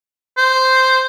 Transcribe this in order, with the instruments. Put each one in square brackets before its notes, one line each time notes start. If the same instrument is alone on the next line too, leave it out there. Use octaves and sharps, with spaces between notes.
[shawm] C5